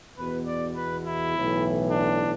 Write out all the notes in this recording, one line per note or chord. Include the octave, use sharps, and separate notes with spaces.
E2 B2 B4
D5
B4
E4
B1 A2 E3
D4